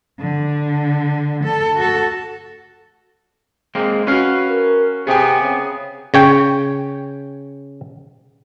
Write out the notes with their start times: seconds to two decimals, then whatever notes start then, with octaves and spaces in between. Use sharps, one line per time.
0.20 D3
1.44 A4
1.76 F#4 A4
3.75 G#3 A#3 C4
4.07 C#4 F#4 B4 F5
4.49 A#4
5.07 C3 B3 C4 G4 G#4 G#5
5.42 C#3
6.14 C#3 C#5 G5